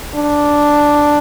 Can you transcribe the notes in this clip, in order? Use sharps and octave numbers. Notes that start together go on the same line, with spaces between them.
D4